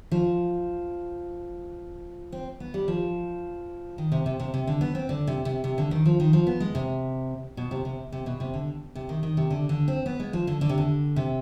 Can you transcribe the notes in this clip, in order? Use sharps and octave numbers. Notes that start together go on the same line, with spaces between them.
F3
C4
B3
G3
F3
D#3
C3
C3
C3
C3
D3
B3
C4
D3
C3
C3
C3
D3
D#3
F3
D#3
F3
B3
G#3
C3
B2
C3
C3
C3
B2
C3
D3
C3
D#3
D#3
C3
D3
D3
C4
B3
G#3
F3
D3
D3
C3
D3
C3